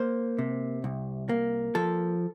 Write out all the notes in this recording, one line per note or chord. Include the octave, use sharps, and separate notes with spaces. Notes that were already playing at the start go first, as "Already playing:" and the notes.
Already playing: A#3 C5
C3
C2
A#3
F3 A4